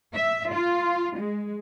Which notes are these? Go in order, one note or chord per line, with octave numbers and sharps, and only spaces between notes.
E5
F4
G#3